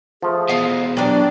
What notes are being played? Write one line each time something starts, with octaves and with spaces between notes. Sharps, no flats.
F3 A3 G#4
E2 B2 F5
F#3 D4 G4 A#4 D5